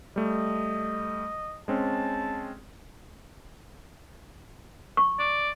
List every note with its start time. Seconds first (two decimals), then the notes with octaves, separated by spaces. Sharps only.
0.16 G3 A3 D#5
1.68 G#3 C4 C#4 A5
4.97 C#6
5.19 D5